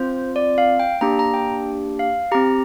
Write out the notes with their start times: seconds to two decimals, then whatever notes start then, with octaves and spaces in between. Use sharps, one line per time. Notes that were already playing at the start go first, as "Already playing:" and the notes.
Already playing: C4 F4 C5
0.36 D5
0.58 F5
0.80 G5
1.01 A#3 D4 G4 A#5
1.19 A#5
1.34 G5
1.99 F5
2.32 C4 G4 A#5